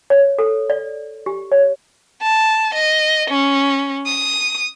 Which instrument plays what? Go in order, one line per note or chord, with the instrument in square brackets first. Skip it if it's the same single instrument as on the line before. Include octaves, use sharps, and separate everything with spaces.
[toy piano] C#5
A4
D5
G4
C#5
[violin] A5
D#5
C#4
D#6